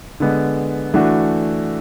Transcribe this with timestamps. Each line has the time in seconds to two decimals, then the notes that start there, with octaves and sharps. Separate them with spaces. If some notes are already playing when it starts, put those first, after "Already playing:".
0.20 D3 G#3 B3
0.94 E3 A3 D4 F#4